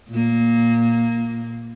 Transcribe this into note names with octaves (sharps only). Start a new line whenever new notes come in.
A#2 A#3